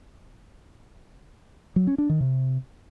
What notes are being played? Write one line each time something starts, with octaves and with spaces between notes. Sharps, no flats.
F#3
C#4
D4
D#3
C3